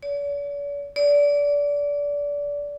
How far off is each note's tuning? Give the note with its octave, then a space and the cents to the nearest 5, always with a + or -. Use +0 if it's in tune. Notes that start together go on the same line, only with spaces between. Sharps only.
D5 -45
D5 -25